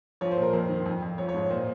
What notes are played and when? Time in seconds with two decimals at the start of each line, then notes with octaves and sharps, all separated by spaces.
0.21 F3 C#5
0.31 C5
0.37 A#2 A#4
0.53 F2 C5
0.69 D#3
0.86 F2
1.02 F2
1.18 F3 C#5
1.29 C#5
1.34 G#2
1.50 A#2 C5